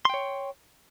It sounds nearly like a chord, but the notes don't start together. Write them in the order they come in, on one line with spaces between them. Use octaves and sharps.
C6 G5 C#5